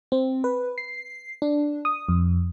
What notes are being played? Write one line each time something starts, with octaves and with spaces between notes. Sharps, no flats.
C4
B4
C7
D4
D#6
F2